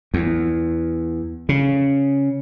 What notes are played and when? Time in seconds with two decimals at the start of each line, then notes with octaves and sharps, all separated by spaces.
0.14 E2
1.49 C#3